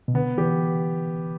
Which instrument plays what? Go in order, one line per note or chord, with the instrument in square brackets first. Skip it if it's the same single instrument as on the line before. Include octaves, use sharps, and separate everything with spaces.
[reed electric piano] B2
[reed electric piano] D3 [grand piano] B3
[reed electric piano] E3 [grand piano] G4